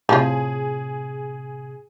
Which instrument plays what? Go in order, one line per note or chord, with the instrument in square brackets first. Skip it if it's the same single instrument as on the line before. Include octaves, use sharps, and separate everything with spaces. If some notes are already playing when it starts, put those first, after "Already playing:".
[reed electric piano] A2 C3 [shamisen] F3 F4 [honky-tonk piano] G#4